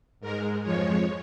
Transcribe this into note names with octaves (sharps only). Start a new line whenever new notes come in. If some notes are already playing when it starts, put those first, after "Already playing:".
G#2 G#3 A#4
F2 F3 G#3 C#5